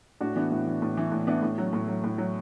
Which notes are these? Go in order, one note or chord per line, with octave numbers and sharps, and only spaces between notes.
A2 D4 F#4
E3 B3 D4
A2
E3
A2
E3
A2
E3 B3 D4
A2
F#3
A2
F#3
A2
F#3